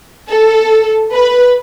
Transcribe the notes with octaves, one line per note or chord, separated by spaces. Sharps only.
A4
B4